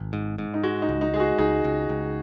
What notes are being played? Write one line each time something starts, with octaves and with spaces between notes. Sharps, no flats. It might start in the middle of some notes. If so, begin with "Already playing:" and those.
Already playing: G#1
G#2
G#2
D#4
G#3 F#4
D#4
C#2
D#4
G#3 G#4
F#4
C#2 D#4 G#4
C#2
C#2